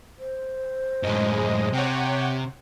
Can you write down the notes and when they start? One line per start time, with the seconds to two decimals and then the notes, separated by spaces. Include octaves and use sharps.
0.19 C5
1.03 F#2 A2 G#3 D#5
1.73 C3 C#5 F#5 G5